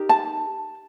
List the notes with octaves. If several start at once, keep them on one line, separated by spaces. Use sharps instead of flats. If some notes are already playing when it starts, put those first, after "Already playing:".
Already playing: D#4 G4 A#4
A5